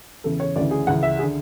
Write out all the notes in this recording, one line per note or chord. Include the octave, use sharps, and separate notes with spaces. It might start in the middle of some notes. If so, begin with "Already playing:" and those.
E2 C#3 E3 A4
C#5
D2 C#3 E3 D5
G#4
C#2 C#3 E3 F#5
E5
G#4
D3